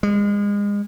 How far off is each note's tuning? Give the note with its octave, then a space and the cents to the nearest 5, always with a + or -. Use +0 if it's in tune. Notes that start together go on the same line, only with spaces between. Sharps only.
G#3 -30